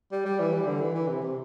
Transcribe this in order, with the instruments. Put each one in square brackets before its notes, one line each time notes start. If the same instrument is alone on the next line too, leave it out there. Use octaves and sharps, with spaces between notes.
[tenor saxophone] G3
G3
E3
G3
D3
E3
E3
C3
C3